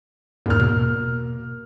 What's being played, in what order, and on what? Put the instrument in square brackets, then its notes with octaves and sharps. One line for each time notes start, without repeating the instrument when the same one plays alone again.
[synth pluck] E2 G#2 [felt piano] A#3 F6
[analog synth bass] B2